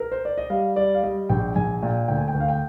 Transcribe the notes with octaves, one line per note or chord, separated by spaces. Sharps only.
A#4
C5
D5
D#5
G3 F5
G3 D5
F5
G3 D#5
A#1 G5
A#1 G#5
A#2 G5
D2 G5
G#5
G5
D2
F5
G5